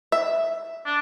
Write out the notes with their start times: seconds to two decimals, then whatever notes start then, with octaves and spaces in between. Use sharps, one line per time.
0.12 E5
0.86 D4